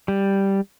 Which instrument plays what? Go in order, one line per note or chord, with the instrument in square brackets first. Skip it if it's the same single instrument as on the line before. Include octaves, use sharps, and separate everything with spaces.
[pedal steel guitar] G3